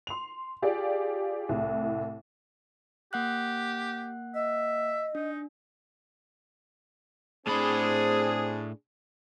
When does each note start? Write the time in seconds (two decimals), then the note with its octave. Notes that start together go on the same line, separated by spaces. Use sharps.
0.07 C6 F7
0.62 F4 G4 G#4 D5
1.49 C2 A2
3.13 A#3 G4 F#5 F#6
4.34 D#5 E5
5.15 D4 D#4
7.47 A2 C4 D4 G#4 C5 B5